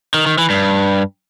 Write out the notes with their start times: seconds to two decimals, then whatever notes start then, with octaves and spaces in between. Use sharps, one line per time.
0.14 D#3
0.26 D#3
0.38 E3
0.50 G2